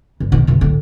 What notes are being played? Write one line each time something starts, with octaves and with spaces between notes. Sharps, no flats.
G2
B2 D#3
F#2 B2
A2 D3